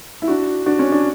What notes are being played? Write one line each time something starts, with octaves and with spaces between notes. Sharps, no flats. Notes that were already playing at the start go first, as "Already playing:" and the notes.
E4
D4 F#4
D4 F#4
C#4
D4